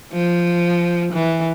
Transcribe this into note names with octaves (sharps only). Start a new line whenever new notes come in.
F3
E3